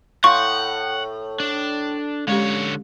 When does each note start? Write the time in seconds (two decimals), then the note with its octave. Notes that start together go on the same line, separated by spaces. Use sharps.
0.24 A2 F5 F#5 C6 C#6
1.40 D4
2.28 D3 G#3 C#4 G4 C#5